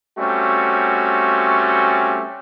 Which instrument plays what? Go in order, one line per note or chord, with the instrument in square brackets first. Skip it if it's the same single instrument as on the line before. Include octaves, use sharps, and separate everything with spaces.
[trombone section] G3 A3 C4 C#4 F#4